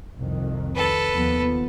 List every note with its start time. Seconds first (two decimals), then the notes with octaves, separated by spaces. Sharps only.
0.18 C2 F2 D#3
0.75 A4 B4
1.13 D#2 F3 B3